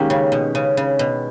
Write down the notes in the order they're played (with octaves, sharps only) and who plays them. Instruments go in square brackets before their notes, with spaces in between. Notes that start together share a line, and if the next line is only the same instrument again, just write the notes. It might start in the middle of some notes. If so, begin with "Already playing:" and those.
Already playing: [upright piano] D#3 G#3 C#4 G4 [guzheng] A#3
[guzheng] C#3
B2
C#3
C#3
B2